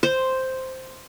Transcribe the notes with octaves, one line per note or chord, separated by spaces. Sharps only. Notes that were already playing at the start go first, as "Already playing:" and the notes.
C5